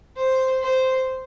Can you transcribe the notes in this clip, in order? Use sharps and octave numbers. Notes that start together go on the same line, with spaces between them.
C5
C5